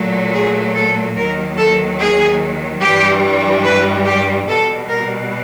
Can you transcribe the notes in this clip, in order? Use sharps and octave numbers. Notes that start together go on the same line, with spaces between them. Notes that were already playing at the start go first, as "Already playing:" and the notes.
Already playing: A#2 F#3 A3
G#4
A4
D#2 D#3 F#3 A#4
A4
G#4
G2 E3 G3 G4
B4
G4
B2 G3 A4
A#4